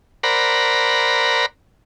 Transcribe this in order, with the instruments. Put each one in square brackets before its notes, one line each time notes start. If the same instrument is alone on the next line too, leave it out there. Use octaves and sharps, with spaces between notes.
[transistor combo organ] A#4 C5 D5 F#5 A#5 B5